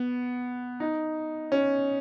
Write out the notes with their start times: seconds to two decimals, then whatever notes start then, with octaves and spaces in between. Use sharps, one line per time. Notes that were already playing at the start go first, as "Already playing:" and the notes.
Already playing: B3
0.80 D#4
1.52 C#4